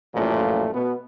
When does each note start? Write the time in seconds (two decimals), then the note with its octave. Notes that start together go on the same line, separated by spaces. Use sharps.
0.15 A1 F#2 A#2 F3 A3
0.74 B2 B3